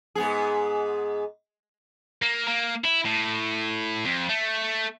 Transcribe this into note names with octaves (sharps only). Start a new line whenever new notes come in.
G#2 B3 G#4
A#3
A#3
E4
A2
F2
A3